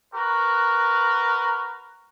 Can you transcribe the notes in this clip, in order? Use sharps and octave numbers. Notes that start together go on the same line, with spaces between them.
F#4 A#4 B4